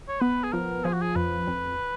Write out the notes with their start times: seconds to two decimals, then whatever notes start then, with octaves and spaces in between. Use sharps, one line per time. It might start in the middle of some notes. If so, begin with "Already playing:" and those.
0.09 C#5
0.21 B3 B4
0.44 G#4
0.53 F3 A#4
0.84 F3 G#4
0.93 F#4
1.02 G#4
1.16 F2 B4
1.47 F2